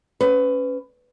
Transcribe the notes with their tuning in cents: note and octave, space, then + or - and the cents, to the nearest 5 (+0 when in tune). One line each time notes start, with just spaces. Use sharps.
C#4 +0 B4 +25